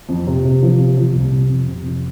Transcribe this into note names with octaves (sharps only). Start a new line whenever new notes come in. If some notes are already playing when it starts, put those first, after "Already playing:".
F2
C3
C3
F3
C3
F3
C2
C3
F2
C3
F2